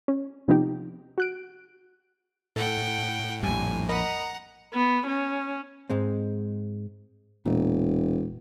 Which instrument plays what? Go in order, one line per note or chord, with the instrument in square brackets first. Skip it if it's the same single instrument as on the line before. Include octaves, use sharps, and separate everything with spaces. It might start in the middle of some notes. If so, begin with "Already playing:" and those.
[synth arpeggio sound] C#4
C3 F3 B3 C4 D#4 G4
F#4 F#6 D7
[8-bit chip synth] A2 [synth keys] A4 [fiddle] F#5 G5
[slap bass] A#1 F2 [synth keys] G3 [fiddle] G#5
[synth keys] A#4 D#5 B5 [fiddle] F#5 A#5
[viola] B3
C#4
[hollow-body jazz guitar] G#2 G#3 C4
[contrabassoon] E1 [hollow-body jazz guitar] A#2